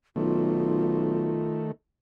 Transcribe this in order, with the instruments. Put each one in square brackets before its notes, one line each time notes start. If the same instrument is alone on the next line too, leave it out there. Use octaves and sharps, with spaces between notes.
[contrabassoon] B1 [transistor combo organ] D#3 A3 [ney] F4